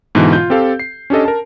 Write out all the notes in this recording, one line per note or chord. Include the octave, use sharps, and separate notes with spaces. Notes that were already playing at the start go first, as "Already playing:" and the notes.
G#2 B2 D3 E3
F4 G6
C4 G4 A4 F5
C7
C#4 D4 G4 A4 D#5
A#4 A5